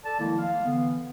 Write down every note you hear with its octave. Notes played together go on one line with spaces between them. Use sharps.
A4 D5 A5
D#3 F3 G#3 A#3 E4
G#3 F5
D3 E3 B3